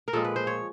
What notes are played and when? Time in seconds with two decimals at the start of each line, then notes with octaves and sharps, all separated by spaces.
0.08 A#4
0.13 A#2 F3 G#3 A4
0.25 B4
0.36 C5
0.47 C#5